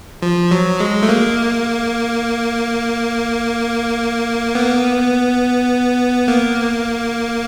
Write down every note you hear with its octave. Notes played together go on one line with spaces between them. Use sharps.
F3
F#3
G#3
A3
A#3
B3
A#3